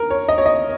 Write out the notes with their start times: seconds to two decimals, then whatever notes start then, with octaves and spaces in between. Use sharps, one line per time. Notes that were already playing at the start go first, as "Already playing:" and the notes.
Already playing: A#4
0.10 C#5
0.29 D#5
0.38 C#5
0.46 D#5